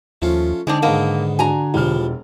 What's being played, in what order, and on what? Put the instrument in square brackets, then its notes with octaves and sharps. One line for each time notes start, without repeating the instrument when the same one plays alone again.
[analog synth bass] D#2 [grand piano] F3 [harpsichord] A3 C#4 F4
[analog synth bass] D3 [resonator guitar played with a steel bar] G#3 C4 D4 [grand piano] D#4
[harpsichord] G#2 D#3 B3 [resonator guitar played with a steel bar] A#3
[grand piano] D4 F#4 [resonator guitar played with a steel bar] G#5 A#5
[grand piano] E1 F6 [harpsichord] F3 G3